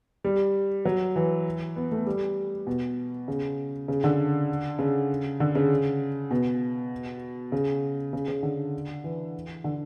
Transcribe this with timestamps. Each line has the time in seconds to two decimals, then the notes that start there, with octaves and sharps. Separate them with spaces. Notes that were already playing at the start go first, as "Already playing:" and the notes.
0.24 G3
0.85 F#3
1.16 E3
1.76 B3
1.92 A3
2.06 G3
2.67 B2
3.28 C#3
3.88 C#3
4.04 D3
4.79 C#3
5.40 D3
5.55 C#3
6.31 B2
7.52 C#3
8.13 C#3
8.28 C#3
8.43 D3
9.04 E3
9.64 D3